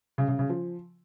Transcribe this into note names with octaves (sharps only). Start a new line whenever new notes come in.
C#3
C#3
C#3
F3